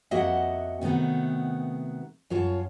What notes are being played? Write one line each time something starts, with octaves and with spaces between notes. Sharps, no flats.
F2 A#3 F#4 D#5 E5 F#5
C3 D#3 A3 B3 F#4
F#2 F4 C#5 A5